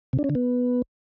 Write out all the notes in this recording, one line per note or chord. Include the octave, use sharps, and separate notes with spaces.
C3
D4
C#4
D3
B3